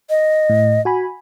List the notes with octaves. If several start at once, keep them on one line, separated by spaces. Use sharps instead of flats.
D#5
A2
F#4 G#5 B5